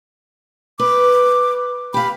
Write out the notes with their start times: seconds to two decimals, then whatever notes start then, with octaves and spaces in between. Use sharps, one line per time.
0.79 B4 D6
1.94 G4 F5 B5